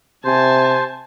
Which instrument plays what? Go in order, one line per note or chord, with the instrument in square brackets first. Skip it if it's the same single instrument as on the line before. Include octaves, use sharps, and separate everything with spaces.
[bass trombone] C3 [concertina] C5 [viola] G#5 A5